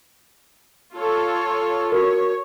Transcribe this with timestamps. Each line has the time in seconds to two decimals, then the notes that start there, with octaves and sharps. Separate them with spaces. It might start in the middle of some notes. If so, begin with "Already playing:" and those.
0.95 F4 A4 C#5
1.92 F#4 A#4 C#5